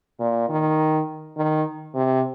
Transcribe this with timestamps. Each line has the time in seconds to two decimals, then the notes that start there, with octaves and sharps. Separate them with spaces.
0.19 A#2
0.49 D#3
1.37 D#3
1.95 C3